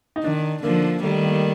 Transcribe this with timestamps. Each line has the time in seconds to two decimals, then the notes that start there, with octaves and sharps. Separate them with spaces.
0.16 D#4
0.23 D#3 D4
0.63 D3 F3 A#3
1.04 D#3 G3 A3
1.24 A#3